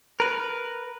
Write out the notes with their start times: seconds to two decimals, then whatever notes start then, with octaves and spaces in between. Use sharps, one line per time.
0.20 A#4 B4